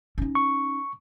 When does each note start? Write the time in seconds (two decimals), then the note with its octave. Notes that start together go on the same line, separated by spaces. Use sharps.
0.18 C#4 D#4
0.35 C#6